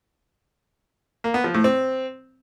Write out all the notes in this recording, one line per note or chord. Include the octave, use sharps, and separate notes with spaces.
A#3
B3
F3
A2
C4